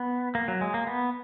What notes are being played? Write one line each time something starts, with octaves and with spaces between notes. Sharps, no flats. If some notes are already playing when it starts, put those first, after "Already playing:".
Already playing: B3
A#3
F#3
G#3
A#3
B3